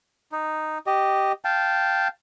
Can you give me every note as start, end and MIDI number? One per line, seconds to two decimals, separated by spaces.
0.32 0.78 63
0.87 1.32 67
0.87 1.32 75
1.45 2.08 77
1.45 2.08 79
1.45 2.08 81